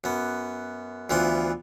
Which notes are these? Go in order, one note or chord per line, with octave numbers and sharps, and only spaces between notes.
F#2 B3
D2 E3 F3 B3 C6